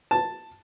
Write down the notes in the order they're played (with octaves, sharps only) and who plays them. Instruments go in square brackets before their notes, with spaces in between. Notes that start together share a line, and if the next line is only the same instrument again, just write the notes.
[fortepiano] A5